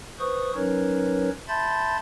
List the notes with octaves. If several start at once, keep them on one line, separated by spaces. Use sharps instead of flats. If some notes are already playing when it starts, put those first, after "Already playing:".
B4 C5 C#6 D#6
F#3 C#4 D#4 A#4 B4 C#5
E5 A5 B5 C6 G6 A6